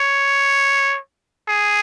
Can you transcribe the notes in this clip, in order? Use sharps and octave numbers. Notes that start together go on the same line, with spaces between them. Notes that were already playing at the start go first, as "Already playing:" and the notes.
Already playing: C#5
G#4